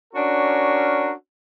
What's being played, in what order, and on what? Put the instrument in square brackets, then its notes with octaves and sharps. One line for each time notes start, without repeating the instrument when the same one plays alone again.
[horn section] C#4 D4 F#4 A#4